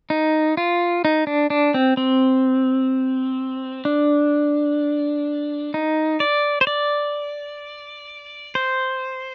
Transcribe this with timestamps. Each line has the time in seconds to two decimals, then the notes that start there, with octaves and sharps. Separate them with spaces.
0.10 D#4
0.57 F4
1.05 D#4
1.27 D4
1.50 D4
1.74 C4
1.97 C4
3.85 D4
5.74 D#4
6.20 D5
6.61 C5
6.67 D5
8.55 C5